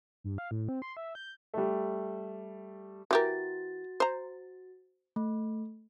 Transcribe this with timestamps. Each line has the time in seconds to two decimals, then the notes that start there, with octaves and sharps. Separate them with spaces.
0.24 G2
0.38 F5
0.51 A2
0.68 C4
0.82 C6
0.97 E5
1.15 G6
1.54 G3 A3
3.11 E3 F#4 G4 A#4 A6
4.00 C5 A#5
5.16 A3